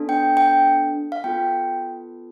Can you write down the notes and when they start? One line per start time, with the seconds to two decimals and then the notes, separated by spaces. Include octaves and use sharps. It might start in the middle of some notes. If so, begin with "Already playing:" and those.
Already playing: B3 D4 A4
0.09 G5
0.37 G5
1.12 F5
1.24 B3 F4 A4 G5